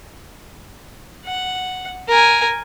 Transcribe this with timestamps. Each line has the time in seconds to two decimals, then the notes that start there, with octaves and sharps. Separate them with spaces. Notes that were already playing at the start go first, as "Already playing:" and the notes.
1.26 F#5
2.08 A#4 G#5